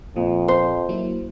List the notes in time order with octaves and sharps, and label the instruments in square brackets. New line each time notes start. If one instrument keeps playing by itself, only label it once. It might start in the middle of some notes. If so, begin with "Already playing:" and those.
[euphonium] F2 [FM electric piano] A#2 F3 D#5
[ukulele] C5
[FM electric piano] F#3 A#3 E4